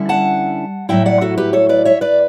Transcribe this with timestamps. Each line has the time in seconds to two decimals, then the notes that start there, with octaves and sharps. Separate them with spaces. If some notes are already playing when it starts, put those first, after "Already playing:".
Already playing: D3 G3 C#4 E4
0.09 F#5 A5
0.89 A2 F#3 C#4 E4 E5 G5
1.06 D5 F#5
1.21 F#4 A4
1.38 G4 B4
1.53 A4 C#5
1.69 B4 D5
1.85 C#5 E5
2.01 B4 D5